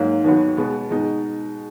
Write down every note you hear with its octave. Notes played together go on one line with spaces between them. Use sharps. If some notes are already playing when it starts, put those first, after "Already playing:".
Already playing: G#2 F#3 A#3
D#2 D#3 F#3 B3 F#4
B2 G#3 B3
B2 G#3 D#4